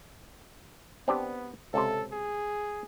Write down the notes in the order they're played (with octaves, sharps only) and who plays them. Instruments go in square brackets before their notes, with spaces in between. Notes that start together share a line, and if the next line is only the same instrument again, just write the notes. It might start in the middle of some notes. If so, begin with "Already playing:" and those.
[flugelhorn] B3 [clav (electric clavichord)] C4 D4 G4
[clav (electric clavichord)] C#2 C3 [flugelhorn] A4
[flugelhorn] G#4